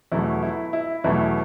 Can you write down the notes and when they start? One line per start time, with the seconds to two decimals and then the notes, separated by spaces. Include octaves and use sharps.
0.12 E2 B2 F#3 A3 E4
0.42 E4
0.73 E4
1.04 E2 B2 F#3 A3 E4